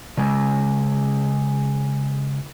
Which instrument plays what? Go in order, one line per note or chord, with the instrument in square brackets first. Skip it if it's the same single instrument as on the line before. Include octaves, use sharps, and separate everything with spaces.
[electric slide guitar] C#3 G#3